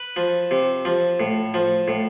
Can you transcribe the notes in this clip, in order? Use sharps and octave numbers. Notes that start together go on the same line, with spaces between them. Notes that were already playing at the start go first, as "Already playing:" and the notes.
Already playing: B4
F3
C3
F3
A2
F3
A2